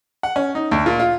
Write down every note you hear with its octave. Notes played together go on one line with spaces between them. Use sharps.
F#5
C#4
D#4
D2
A#2
F4